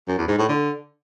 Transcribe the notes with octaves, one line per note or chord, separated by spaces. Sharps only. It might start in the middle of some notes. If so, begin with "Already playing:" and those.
F#2
E2
G#2
A2
D3